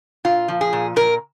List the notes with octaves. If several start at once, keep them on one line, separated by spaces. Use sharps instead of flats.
A#2 F4
F3
G#4
A#2
A#2 A#4